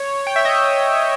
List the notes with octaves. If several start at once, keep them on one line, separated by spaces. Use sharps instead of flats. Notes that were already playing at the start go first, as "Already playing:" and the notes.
Already playing: C#5
G5
E5
D#5